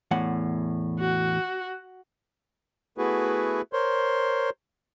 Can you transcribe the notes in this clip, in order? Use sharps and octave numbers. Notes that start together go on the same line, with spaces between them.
E2 A2 F#5
F#4
A3 B3 E4 F#4 G#4 B4
A#4 C5 C#5 C6